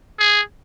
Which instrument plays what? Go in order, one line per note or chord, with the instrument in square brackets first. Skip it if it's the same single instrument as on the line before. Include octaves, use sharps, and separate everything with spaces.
[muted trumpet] G#4